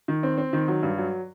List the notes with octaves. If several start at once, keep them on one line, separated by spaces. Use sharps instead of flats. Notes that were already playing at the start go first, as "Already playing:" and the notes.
D#3
C4
C4
D#3
F#3
G2
F#3